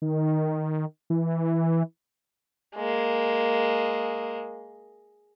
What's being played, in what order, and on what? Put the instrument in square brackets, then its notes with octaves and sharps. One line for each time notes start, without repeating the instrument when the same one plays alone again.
[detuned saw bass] D#3
E3
[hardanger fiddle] G#3 A#3